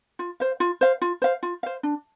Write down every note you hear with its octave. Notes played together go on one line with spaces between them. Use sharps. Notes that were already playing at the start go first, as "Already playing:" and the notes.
F4
C5 F5
F4
C5 F5
F4
C5 F5
F4
C5 F5
D4